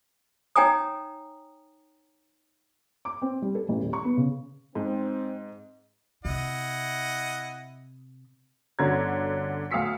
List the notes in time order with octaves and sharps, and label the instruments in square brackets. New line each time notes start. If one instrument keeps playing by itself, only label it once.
[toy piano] D#4 C#5 G5 G#5 A#5 D#6
[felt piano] D6
C4
G3
A4
A1
D#1
C#6
B3
C#3
[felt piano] G#2 [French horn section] C4
[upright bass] C3 [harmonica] E4 D#5 F#5
[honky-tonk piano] G1 D3 C#4 F#4 A#5 G#6
D2 F5 D#6 E6 B6 C#7